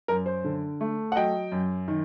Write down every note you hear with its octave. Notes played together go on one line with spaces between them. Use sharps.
F#2 A#4
C5
D3
A3
F#5
F#3 D#5 G5
F#2
D#3